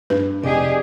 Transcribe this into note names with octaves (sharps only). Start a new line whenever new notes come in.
G2 B4
F1 G4 G#4 D5 D#5 G#5